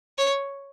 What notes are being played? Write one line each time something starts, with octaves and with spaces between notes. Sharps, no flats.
C#5